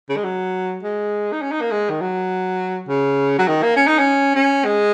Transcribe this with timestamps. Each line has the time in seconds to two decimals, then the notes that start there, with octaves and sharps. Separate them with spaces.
0.09 C#3
0.16 G#3
0.24 F#3
0.83 G#3
1.32 D#4
1.42 C#4
1.51 D#4
1.61 A#3
1.71 G#3
1.90 D#3
2.01 F#3
2.88 C#3
3.38 F#3
3.48 D#3
3.62 A#3
3.76 C#4
3.87 D#4
3.98 C#4
4.35 C#4
4.65 G#3